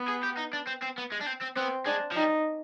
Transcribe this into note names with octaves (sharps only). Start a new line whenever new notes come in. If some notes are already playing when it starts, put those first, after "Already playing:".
Already playing: B3
G#4
G4
D#4
D4
C4
C4
B3
G#3
D4
C4
C4
B3 C4
G#3 D4
F3
G3 D#4